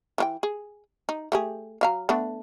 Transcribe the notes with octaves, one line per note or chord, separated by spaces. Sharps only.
E3 F4 G5
G#4
D#4
A3 G4 G#4
F#3 F5 A#5
A3 B3 D4